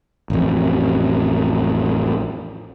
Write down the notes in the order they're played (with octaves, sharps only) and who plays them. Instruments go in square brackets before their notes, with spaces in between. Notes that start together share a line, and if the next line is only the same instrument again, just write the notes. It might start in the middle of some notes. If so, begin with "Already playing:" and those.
[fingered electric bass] A1 F2